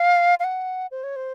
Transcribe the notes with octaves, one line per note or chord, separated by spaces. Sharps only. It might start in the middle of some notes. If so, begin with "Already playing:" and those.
Already playing: F5
F5
F#5
C5
C#5
C5